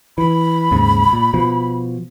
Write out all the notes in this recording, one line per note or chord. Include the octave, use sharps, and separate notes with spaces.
E3 B5
D#2 G#2 C#3
A#2
B2 F3